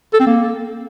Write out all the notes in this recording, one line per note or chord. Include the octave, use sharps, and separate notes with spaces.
A4
C4
A#3